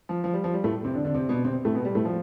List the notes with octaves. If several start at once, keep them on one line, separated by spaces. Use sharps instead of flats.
F3
F3
G3
F3
G3
A2 A3
C3 C4
D3 D4
D3 D4
C3 C4
B2 B3
C3 C4
A2 A3
B2 B3
G3
A2 A3
F3